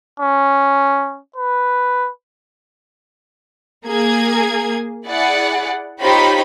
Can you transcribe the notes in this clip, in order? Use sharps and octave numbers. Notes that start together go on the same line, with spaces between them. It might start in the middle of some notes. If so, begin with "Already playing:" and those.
C#4
B4
A#3 G#4 G#6
E4 G#4 D5 F#5
D#4 F4 G4 C5 C#5 B5